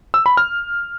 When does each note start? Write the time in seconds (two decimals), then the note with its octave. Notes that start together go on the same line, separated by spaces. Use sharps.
0.14 E6
0.26 B5
0.37 F6